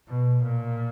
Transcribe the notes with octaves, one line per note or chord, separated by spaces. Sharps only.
B2
A#2